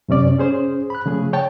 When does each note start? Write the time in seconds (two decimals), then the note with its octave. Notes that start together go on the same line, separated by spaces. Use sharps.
0.09 F#2 C3 C#4 D5
0.38 C#4 G#4 C5
0.90 B5 F#6
1.06 C#3 F3 A3 G#4
1.33 C#5 G5 A5